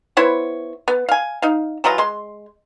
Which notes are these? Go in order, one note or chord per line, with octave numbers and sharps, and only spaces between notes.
B3 E4 C5 C#5
B3
F5 G#5
D#4 F5
E3 F#3 F4 D#5
G#3 C6